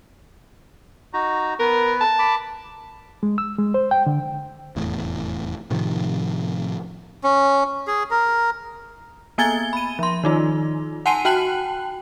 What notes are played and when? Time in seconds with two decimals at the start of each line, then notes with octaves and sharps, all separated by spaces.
1.13 D#4 F#4 A#5
1.60 B3 A#4 B4
2.01 A5
2.19 B5 D6
3.23 G#3
3.38 E6
3.58 G#3
3.74 C5
3.91 G5
4.06 D3
4.76 F1 E2 A2
5.70 A2 C3 D#3 F3
7.24 C#4
7.87 G#4
8.11 A#4
9.38 A#3 B3 G#5 G#6 A6 G7
9.73 B5 D#7
9.99 F3 C6
10.24 D#3 D#4 F4
11.06 F#5 G#5 A5 C6 C7 D#7
11.25 F#4 G5 A5 F#6 F#7